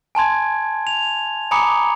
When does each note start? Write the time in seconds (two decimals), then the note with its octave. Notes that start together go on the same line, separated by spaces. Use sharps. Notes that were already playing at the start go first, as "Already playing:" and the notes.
0.15 G#5 A5 C6 G#6
0.87 F7
1.51 G#5 A#5 B5 D6 D#6 C#7